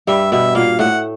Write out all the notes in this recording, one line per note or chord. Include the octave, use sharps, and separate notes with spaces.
G2 G3 E5
B2 B3 E5
A#2 A#3 F5
A2 A3 F#5